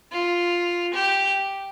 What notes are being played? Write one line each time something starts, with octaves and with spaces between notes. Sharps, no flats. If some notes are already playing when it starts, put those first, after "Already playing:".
F4
G4